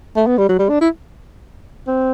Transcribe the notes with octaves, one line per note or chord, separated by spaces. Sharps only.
A3
B3
G3
F#3
G3
D4
E4
C4